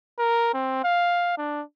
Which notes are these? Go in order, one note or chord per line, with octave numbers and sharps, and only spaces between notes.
A#4
C4
F5
D4